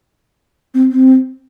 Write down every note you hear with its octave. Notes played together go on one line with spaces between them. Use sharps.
C4
C4